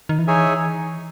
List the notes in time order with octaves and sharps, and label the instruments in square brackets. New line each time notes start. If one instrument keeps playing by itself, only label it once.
[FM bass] D#3
E3
[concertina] D#4 G#4 C#5 E5 G#5